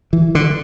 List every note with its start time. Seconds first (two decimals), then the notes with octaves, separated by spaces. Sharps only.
0.13 E3
0.35 D3